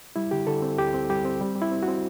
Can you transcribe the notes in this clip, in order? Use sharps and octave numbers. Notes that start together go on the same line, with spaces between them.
G3 E4
D3 G4
D3 A4
C4
D2 G4
C4
G3 G4
C4
G3
G3
E4
C4
F#4
C4